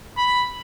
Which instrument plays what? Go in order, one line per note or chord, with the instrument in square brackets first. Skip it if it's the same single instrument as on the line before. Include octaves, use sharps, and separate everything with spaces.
[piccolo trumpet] B5